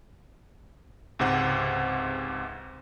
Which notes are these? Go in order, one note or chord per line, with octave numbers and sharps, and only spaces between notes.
C#2 G#2 C3 C5 F#5